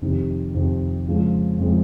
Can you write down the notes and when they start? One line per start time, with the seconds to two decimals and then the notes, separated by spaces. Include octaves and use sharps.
0.01 F2 C3 D#3
0.54 F2 C3 D#3
1.06 F2 C#3 F3 G#3
1.58 F2 C#3 F3 G#3